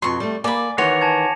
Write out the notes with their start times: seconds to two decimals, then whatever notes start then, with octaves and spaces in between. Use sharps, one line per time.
0.02 F2 B2 C6 C#6
0.20 G3 A3
0.44 A#3 D5 G#5 B5 D6
0.78 D#3 E3 F#4 C#5 C6 A#6 C#7 F7
1.01 G#5 A5 G#6